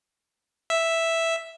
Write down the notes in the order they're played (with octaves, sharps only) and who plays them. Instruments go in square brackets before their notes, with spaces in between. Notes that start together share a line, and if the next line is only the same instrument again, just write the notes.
[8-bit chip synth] E5